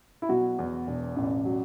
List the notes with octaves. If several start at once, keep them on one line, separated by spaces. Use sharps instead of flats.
E4
B2 F#3 F#4
E2
E1
A1
F#3